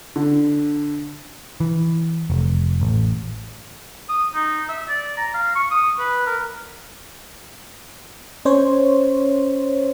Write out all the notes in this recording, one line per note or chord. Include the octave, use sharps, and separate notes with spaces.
D3
E3
F1
A1
D#6
D#4
E5
D5
A#5
F5
C#6
D#6
B4
A#4
C#4 C5 C#5